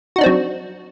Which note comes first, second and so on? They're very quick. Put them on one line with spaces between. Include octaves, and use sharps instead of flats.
F#4 D#4 D4 C4 F#3